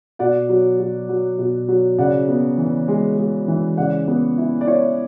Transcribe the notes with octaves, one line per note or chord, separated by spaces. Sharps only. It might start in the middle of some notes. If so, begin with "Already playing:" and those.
B2 D5 F#5
F#3
F#3
F#3
B2
F#3
C#3 D5 F#5
B3
E3
G#3
G#3
E3
C#3 D5 F#5
B3
E4
D5
E4 C#5 E5